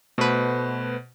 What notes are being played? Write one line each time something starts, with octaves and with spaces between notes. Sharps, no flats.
B2 A3 B4 C5